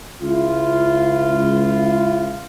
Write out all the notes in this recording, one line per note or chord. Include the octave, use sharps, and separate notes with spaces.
C#2 E4 F4